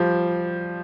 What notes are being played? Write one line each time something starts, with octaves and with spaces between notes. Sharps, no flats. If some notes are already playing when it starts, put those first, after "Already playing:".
Already playing: F3 G3